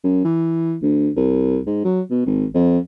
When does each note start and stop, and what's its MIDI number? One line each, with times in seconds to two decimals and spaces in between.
0.04 0.20 42
0.25 0.76 52
0.82 1.10 38
1.16 1.59 36
1.67 1.80 44
1.85 2.01 54
2.10 2.25 47
2.26 2.46 32
2.55 2.79 41